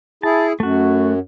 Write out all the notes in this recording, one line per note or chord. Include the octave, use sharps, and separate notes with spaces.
E4 G#4 A5
F#2 A3 F#4